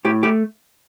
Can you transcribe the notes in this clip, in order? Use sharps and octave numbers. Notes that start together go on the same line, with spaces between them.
A2 G4
A3 G4